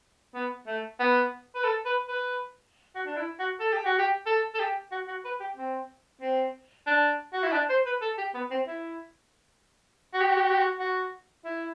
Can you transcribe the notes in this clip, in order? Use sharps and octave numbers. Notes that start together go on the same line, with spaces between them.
B3
A3
B3
B4
A4
B4
B4
F#4
D4
E4
F#4
A4
G4
F#4
G4
A4
A4
G4
F#4
F#4
B4
G4
C4
C4
D4
F#4
E4
D4
C5
B4
A4
G4
B3
C4
E4
F#4
G4
F#4
G4
F#4
G4
F#4
F#4
E4